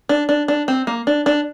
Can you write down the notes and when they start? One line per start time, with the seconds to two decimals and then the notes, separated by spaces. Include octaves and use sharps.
0.09 D4
0.29 D4
0.48 D4
0.68 C4
0.87 A#3
1.07 D4
1.26 D4